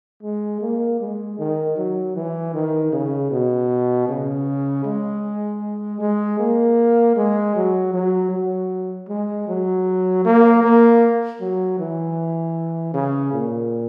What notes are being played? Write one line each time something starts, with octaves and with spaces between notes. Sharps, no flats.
G#3
A#3
G#3
D#3
F#3
E3
D#3
C#3
B2
C#3
G#3
G#3
A#3
G#3
F#3
F#3
F#3
G#3
F#3
A#3
A#3
F#3
E3
C#3
A#2